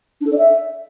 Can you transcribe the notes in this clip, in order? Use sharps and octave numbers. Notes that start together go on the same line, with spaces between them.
D4
A4
D5
E5